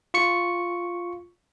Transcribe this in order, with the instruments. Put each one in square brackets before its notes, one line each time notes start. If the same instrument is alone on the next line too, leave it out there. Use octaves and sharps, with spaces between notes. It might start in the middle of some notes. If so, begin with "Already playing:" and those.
[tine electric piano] F4 C#6 C#7